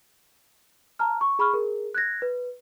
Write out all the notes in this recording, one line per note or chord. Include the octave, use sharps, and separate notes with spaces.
A5 A#5 F6
C#6
G#4 B5 C#6 F6
G#4 A#4
F#6 G#6 A#6
B4